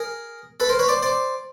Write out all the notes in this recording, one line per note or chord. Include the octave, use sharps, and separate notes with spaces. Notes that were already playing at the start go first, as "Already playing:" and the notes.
Already playing: G#4 A#4
A4 B4
A#4 C5
B4 C#5
C5 D5
C5 D5